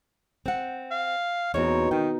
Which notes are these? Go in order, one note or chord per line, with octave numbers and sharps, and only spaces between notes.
C4 F#5
F5
E2 B2 C4 D#4 C#5 D#5
D#3 G5